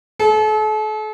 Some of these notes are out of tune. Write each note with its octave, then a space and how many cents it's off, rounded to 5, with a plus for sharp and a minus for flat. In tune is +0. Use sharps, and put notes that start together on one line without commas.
A4 -40